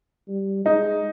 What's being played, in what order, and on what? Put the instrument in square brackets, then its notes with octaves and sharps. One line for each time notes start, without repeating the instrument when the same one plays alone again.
[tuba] G3
[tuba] G#3 [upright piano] D#4